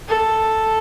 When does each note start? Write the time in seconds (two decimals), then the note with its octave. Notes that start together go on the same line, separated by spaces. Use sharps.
0.08 A4